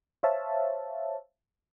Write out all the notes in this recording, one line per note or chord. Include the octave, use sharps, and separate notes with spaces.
C5 C#5 E5 F5 A5